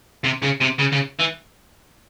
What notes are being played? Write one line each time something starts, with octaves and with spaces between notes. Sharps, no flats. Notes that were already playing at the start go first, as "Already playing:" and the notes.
C3
C#3
C3
C#3
C#3
E3